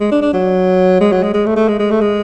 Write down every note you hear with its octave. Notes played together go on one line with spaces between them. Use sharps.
G#3
D4
D4
F#3
G#3
F#3
G#3
G#3
A3
A3
G#3
G#3
A3
G#3